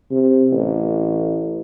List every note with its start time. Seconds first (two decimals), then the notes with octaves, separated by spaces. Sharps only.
0.11 C3
0.52 A1